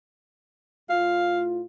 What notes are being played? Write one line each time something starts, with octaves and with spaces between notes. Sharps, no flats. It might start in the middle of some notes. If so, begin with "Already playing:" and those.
A2 F4 F5